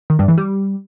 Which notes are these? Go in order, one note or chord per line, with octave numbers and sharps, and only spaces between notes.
D#3
G2
E3
G3